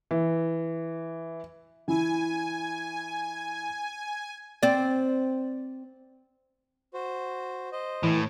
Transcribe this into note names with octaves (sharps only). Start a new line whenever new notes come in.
E3
E3 E4 G#5
C4 D5
F#4 C5
C5 D#5
A2 E3